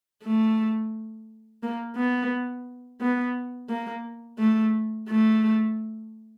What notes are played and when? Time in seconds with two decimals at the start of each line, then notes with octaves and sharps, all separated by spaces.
0.24 A3
1.63 A#3
1.96 B3
3.01 B3
3.69 A#3
4.39 A3
5.08 A3